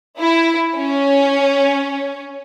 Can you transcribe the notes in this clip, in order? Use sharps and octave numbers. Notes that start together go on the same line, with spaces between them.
E4
C#4